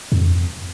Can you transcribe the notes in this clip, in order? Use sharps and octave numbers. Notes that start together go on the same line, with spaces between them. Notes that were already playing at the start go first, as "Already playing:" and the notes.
F2